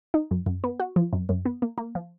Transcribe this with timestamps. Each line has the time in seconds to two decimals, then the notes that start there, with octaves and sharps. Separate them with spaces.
0.14 D#4
0.31 F#2
0.46 F#2
0.64 B3
0.80 F#4
0.96 F3
1.13 F#2
1.29 F#2
1.45 B3
1.62 A#3
1.78 A#3
1.95 F3